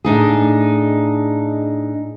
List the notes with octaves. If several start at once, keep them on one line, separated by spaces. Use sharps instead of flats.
A2 D4 D#4 G#4